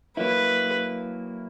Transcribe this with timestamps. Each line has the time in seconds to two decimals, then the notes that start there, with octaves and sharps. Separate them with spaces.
0.17 F#3 A#3 E4 B4